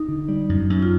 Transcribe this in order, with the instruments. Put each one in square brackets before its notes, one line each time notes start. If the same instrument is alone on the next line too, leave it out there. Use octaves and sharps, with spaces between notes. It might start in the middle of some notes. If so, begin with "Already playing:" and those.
Already playing: [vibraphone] D#4
[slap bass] D3
G3
F#2
F#2
[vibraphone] F4